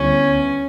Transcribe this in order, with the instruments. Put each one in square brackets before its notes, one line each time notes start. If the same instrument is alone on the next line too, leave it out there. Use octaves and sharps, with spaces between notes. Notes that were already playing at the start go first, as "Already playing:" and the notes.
Already playing: [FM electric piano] D2 D3 G3 B3 E4 [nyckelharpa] C#4